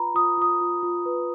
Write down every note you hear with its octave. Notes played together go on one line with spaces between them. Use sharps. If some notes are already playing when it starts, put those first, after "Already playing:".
Already playing: F4 B4 A#5 B5
F4 D#6
F4 D#6
F4
F4
B4